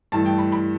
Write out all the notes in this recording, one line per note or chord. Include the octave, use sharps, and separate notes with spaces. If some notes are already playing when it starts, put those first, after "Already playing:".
G2 E3 A3 A5
G5
B5
B5